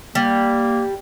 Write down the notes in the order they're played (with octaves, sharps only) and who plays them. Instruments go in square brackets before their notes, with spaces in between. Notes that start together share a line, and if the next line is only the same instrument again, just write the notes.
[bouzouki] G3 [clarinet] A#3